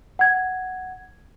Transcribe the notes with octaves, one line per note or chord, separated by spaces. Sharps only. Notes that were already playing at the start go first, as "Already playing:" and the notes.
F#5 G#6